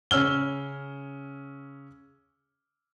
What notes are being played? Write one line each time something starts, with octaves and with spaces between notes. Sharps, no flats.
C#3 C#4 E6 F6 G7